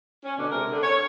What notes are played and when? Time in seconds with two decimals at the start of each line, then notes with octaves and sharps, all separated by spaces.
0.24 C#4
0.38 B2 D3 D4
0.50 C3 G#3 A#4
0.71 D3
0.83 C#5